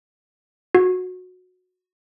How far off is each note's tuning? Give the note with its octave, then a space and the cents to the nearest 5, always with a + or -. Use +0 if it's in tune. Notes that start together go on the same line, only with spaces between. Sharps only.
F#4 -15